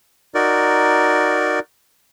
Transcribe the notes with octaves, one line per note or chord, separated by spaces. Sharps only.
D#4 F#4 A#4 D5